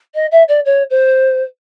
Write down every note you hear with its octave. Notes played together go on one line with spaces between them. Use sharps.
D#5
E5
D5
C#5
C5